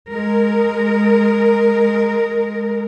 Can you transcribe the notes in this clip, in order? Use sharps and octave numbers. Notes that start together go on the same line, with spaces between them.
G#3 A#4